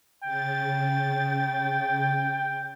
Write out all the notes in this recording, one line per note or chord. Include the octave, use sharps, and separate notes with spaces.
C#3 G5 A6